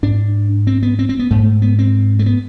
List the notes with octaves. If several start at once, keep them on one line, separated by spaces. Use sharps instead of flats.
G#2 D4
C4
B3
C4
C4
B3
G#2 A3
B3
C4
A3
B3